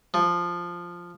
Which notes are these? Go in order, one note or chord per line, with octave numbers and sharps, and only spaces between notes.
F3